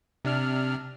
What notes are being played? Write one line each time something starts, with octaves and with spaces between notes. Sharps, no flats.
C3 D4 F6